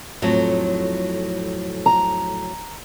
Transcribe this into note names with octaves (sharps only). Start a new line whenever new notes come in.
F2 A2 F#3
A#5